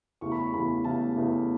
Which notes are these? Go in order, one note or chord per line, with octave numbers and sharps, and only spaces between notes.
E2 C#3 E3 A3 C#6
B5
C#6
E2 C#3 E3 A3 B5
E2 C#3 E3 A3 A5
E2 C#3 E3 A3